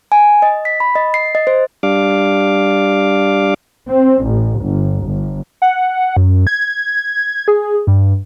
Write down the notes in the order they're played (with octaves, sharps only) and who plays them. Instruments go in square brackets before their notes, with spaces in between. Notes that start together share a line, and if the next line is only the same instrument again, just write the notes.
[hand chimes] G#5
D#5
B6
B5
D#5
C7
D#5
C5
[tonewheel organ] G3 D4 F5 D6
[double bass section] C4
A1
G1
G1
[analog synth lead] F#5
F#2
G#6
G#4
G2